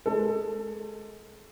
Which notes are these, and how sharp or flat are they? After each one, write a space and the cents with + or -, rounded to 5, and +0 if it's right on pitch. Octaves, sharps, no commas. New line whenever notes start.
G#3 +25 A4 +30